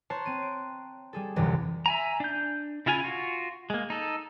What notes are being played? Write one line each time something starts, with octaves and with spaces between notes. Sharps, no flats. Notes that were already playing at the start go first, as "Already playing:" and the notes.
C5 C#5 A5 A#5 C6 F#6
C4 D#7
D7
G3 G#4 A4
G1 C2 F#2 C3 E3
E5 G#5 A#5
D4 G6
C#3 E4 F4 F5 G#5
F4 F#4
G#3 A#3
D#4 A4